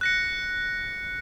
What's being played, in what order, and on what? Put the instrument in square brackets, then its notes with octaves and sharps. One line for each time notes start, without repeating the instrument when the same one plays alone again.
[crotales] F#6 A#6 C#7